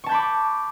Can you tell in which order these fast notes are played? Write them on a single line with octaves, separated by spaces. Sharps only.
C#6 A5 G6 B5 D6